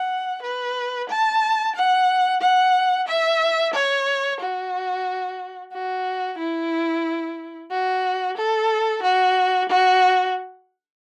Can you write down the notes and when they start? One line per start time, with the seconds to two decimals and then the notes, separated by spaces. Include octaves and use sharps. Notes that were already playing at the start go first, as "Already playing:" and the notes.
Already playing: F#5
0.42 B4
1.10 A5
1.75 F#5
2.41 F#5
3.08 E5
3.73 C#5
4.40 F#4
5.73 F#4
6.38 E4
7.71 F#4
8.37 A4
9.03 F#4
9.69 F#4